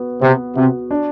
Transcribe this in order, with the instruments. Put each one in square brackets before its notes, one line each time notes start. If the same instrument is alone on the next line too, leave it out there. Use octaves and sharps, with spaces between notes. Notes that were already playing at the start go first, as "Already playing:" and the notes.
Already playing: [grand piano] B3 F#4
[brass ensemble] C3 [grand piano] B3
[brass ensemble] C3 [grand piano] F#4
[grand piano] D4